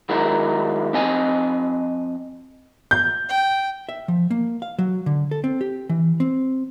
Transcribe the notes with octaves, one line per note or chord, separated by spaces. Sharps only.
D#3 F#3 G#3 E4 A#4
F3 C4 D#5 G#5
G6
G5
E5
F3
A#3
F5
F#3
D3
A4
C4
G4
E3
C4